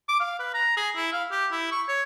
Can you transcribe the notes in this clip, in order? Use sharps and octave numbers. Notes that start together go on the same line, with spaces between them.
D6
F5
B4
A#5
G#4
E4
F5
G4
E4
C#6
C#5